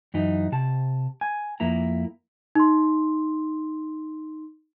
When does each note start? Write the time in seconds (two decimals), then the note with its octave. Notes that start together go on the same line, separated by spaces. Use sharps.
0.14 F#2 E3 D#4
0.52 C3 A5
1.21 G#5
1.60 F2 A#3 E4 A#5
2.55 D#4 C6